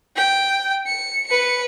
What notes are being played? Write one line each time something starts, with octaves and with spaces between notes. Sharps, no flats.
G5
C#7
B4 C#7